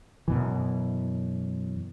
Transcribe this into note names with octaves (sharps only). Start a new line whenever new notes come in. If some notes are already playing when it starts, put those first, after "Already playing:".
F#2 B2 E3